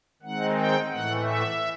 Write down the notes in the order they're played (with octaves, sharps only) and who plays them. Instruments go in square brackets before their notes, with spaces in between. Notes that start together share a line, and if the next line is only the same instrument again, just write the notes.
[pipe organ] D#3 G#3 C4 D#4 F#5
G5
A2 E3 A3 F#5
E5